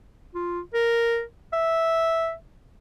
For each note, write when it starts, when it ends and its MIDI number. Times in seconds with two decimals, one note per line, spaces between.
0.35 0.60 65
0.74 1.22 70
1.53 2.33 76